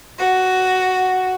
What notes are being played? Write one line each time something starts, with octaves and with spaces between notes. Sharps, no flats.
F#4